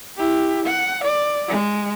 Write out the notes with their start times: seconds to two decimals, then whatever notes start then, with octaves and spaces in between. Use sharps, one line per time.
0.17 E4 G4
0.66 F#5
1.04 D5
1.48 G#3